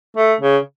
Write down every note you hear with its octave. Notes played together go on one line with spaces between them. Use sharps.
A3
C#3